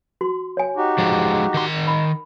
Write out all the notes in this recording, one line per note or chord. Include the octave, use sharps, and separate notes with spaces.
F#4 C6
C#5 G#5
D#4 F#4 G4
F3 G#3
D#3 C6
B5